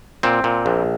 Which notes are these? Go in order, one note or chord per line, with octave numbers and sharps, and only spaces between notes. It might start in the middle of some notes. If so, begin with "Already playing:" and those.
A#2 C4
A#2
A#1